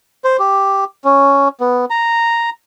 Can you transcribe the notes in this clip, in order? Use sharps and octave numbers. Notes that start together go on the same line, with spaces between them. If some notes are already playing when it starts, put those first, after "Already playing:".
C5
G4
C#4
B3
A#5